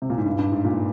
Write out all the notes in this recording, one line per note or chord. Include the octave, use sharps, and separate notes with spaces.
C3
A#2
G#2
G2
G2
G#2
A#2